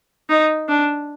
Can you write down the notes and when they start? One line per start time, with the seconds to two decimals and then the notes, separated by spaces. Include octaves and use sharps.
0.29 D#4
0.69 D4